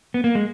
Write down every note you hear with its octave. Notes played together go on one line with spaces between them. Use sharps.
B3
A#3
G#3